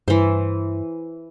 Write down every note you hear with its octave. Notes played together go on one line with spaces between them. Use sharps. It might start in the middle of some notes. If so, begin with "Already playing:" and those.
G2 E3 C5